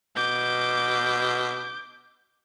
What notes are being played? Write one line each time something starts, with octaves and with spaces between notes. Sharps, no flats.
B2 D6 G6